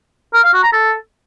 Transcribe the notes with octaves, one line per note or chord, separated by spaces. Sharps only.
A#4
F5
F#4
A#5
A4